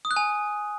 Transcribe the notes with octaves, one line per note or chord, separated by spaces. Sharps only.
D#6
F#6
G#5